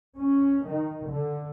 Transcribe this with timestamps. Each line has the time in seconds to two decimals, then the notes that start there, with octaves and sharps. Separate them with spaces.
0.16 C#4
0.66 D#3
1.08 D3